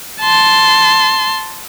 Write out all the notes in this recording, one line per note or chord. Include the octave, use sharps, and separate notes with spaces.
A5 C6